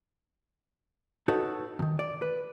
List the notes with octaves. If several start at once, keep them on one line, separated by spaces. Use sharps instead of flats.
D#4 F#4 A4 B4 C#5
E2 D#3
D5
B4